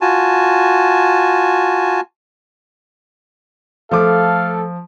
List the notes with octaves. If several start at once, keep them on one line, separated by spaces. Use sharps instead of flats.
F4 F#4 G#5 A5
F3 A3 A4 F5 D6